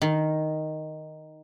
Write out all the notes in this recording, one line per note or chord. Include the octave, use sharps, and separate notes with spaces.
D#3